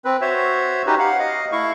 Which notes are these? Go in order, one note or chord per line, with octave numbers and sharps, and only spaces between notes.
C4 B4
F#4 C5 C#5 E5
C#4 D#4 F#4 G4 B4
F5 F#5
D#5 F5
A3 E4 F5 C#6